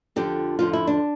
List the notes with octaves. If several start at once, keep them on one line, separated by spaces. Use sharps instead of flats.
F2 D3 F3 G4
F2 D3 F3 F4
E4
D4